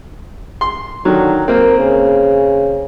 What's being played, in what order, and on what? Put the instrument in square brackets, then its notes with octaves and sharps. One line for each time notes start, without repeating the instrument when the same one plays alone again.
[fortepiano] C6
[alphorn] D3 [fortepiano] D#3 F#3
[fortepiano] A#3 C4 [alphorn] A#4
[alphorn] C#3